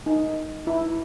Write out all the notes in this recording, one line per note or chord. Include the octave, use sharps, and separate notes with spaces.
D#4
E4